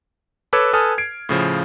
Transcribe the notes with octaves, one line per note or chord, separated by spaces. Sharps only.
A4 B4 C#5 D6 E6 G#6
A4 B4 G#5 A5 D#6 F6
G#6 C7 D7
A2 C#3 F3